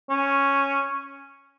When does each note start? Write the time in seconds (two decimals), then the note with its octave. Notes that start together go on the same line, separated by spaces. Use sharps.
0.09 C#4